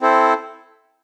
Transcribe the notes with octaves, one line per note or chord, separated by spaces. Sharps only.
C4 E4 A4 C5